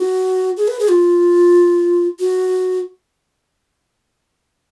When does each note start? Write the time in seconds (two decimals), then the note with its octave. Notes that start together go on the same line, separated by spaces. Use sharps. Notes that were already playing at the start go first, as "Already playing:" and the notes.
Already playing: F#4
0.57 G#4
0.68 B4
0.79 G#4
0.89 F4
2.19 F#4